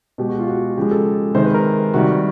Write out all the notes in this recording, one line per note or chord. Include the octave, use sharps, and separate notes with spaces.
B2 G#3 G4
F#4
F4
F#4
C#3 F3 G#3 G4
A4
C3 D#3 G#3 C5
B4
A#4
C3 D#3 G3 F#4